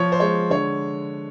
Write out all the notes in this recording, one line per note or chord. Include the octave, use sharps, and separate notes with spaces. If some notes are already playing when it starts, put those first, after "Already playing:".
Already playing: F3 C#5
C5
G#3 C#5
D3 C#5